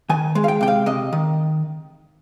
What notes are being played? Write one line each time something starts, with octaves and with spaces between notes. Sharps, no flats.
D#3 G#5
G#3
F5
G5
C3 G5
F5
C3 D#5
D#3